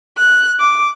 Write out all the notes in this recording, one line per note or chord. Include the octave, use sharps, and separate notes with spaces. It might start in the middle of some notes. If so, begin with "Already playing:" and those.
F#6
D6